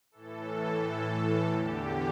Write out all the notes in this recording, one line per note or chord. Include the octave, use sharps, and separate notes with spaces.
A2 E3 A4
E2 D3 G4